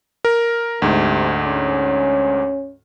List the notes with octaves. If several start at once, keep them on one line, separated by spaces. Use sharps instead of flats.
A#4
D2 G#2 C3
C#4